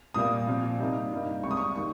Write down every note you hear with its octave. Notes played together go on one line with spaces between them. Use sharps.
A#2 G3 A#3 D#6
A#2 F3 C4
C3 G3 A#3 D#4
G2 G3 A#3 D#4
C#2 C3 G3 C#6
D#6
C#6
D#3 G3 A#3 C#6